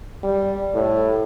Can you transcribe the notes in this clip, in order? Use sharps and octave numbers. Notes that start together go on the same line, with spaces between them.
G3
A2